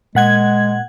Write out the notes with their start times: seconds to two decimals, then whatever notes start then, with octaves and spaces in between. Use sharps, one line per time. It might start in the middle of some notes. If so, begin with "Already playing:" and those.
0.15 A#2 G#3 F#5 G#6